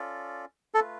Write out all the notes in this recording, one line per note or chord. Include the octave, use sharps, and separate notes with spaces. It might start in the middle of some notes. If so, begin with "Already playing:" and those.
Already playing: C#4 F4 A4 D5
A3 F4 A4 B4